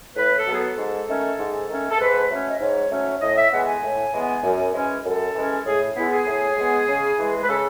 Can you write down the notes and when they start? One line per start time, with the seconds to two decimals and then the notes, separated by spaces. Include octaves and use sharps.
0.16 A2 B4
0.37 A4
0.47 F#3 B3 G#4
0.57 A4
0.77 G#2
1.09 D#3 A3 C#4
1.39 G#2
1.69 D#3 A3 C#4
1.91 A4
2.00 G#2 B4
2.30 F#3 A3 C#4
2.49 D#5
2.60 G#2 C#5
2.91 F#3 A3 C#4
3.21 A2 D#5
3.36 E5
3.51 E3 G#3 B3 F#5
3.67 G#5
3.83 A2
4.13 E3 G#3 B3
4.43 F#2
4.74 E3 G#3 C#4
5.05 F#2 A4
5.35 E3 G#3 C#4
5.66 A2 G#4
5.96 G#3 B3 E4
6.12 G#4
6.26 A2
6.57 G#3 B3
6.88 C#3
7.17 E3 G#3
7.43 B4
7.48 C#3 A4